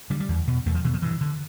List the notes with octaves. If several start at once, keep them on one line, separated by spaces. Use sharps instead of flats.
D3 G3
G3
E2
B2
E2 A3
F3
B2 E3
F3
G2 E3
D3